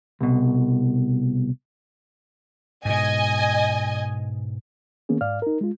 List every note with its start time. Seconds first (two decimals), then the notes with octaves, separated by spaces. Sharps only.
0.21 C2 B2
2.85 G#2 B2 D#5 G#5
5.09 D#3 A#3 B3 C#4 G#4
5.21 G#2 D5 F5 F6
5.42 D#4 A#4
5.61 G#3 F4